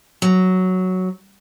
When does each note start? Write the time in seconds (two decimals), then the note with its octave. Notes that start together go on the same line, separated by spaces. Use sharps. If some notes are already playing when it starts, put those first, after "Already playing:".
0.22 F#3